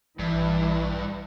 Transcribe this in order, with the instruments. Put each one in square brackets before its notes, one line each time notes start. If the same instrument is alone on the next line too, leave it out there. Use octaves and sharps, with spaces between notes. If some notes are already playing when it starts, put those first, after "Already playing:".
[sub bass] A#1 [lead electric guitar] G2 [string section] E3